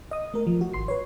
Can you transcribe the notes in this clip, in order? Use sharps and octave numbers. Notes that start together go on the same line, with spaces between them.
D#5 D#6
A3 A#4
F3
F#4
G#1 C6 C7
B4 C#5